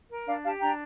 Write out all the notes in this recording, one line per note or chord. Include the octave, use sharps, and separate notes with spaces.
A#4
D4 D5 F5
G4 F5 A5
D4 G5 A#5